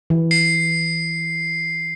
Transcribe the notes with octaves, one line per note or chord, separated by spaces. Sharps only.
E3
C7